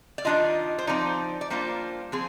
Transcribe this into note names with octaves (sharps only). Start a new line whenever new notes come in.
D5
D#3 G3 D4 F4 D#5
C5
F3 C4 D#4 D5
D5
G3 A#3 D4 F4 C5
F3 C4 G#4